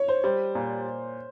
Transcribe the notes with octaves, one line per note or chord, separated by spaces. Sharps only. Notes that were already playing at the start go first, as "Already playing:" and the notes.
Already playing: C#5
C5
G3 C5
A#2